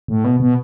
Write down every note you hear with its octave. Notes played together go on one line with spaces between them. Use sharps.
A2
B2
B2